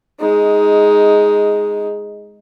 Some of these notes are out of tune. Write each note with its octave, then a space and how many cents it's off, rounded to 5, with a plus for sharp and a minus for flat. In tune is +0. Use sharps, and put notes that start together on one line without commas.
G#3 +0 D#4 +10